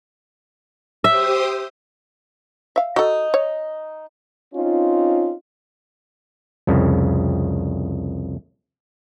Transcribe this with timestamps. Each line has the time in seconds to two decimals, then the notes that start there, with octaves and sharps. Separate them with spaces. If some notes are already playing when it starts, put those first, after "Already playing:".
1.04 G4 C5 E5 D#6
2.76 E5 F5
2.96 D#4 F#4 A4
3.34 C#5
4.54 C4 C#4 D#4 F4
6.67 C2 F2 C#3